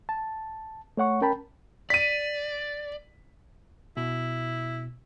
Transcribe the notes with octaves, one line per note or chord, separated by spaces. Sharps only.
A5
A3 C#5 F#5 C#6
C#4 A#4 G5 A5 B5
D5 B6 D#7
B2 E4